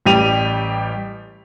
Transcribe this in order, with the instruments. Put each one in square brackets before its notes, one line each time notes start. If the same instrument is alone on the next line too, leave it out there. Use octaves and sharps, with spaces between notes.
[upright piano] A1 G3 G4 D#7 F7